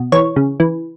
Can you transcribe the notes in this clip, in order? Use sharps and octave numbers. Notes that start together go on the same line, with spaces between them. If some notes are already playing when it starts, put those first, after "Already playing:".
Already playing: B2
E3 C#5
C#3
E3